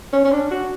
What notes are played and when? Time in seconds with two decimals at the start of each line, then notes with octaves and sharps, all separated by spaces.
0.13 C#4
0.24 C#4
0.32 D4
0.51 F#4